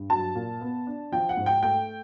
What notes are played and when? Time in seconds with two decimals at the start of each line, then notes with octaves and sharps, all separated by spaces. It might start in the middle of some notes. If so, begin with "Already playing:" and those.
Already playing: G2
0.10 F#3 A5
0.35 A#2
0.61 B3
0.87 D4
1.12 F3 G5
1.29 F#5
1.37 G#2
1.46 G5
1.63 A3 G5